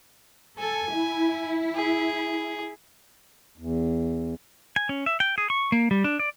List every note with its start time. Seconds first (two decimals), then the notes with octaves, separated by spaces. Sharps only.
0.59 A4 G#5
0.92 E4
1.75 G#4
3.58 E2
4.76 G#5
4.89 C#4
5.06 E5
5.20 G5
5.38 G#4
5.50 C#6
5.72 A#3
5.91 G3
6.04 D4
6.19 D5